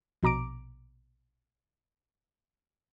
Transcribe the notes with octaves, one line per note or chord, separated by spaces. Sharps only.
A#1 B2 A#5 D6 D7